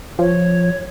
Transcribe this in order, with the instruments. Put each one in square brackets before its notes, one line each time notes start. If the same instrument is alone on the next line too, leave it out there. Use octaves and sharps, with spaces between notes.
[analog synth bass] F3 [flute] C#5